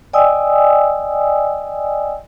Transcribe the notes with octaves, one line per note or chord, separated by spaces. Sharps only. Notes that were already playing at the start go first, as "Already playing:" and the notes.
D5 D#5 G5 G#5 D#6 E6